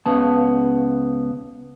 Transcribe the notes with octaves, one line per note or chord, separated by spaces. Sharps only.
C#2 C#3 B3 A5